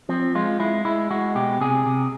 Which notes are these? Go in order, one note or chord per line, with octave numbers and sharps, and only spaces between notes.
F3 C4
G#3 F4
G#3 E4
G#3 E4
G#3 F#4
B2 G4
C3 G#4
C3